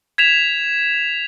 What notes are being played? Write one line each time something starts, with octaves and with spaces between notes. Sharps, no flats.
G#6 B6 E7 F7